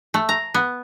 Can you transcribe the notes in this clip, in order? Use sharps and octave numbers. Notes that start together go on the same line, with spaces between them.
A3
A#5
B3